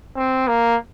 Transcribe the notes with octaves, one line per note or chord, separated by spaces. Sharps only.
C4
A#3